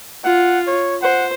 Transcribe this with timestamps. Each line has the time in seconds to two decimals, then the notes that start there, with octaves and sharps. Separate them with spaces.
0.24 F4 F#5
0.67 C#5
1.02 C5 F#5